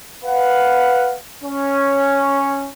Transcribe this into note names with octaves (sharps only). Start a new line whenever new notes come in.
B4 F5 F#5
C#4